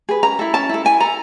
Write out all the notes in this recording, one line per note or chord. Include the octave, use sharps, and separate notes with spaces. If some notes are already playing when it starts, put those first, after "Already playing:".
G#4 B4
C#4 A#5
E4 A4
C#4 A5
E4 A4
E4 G#5
A4 A#5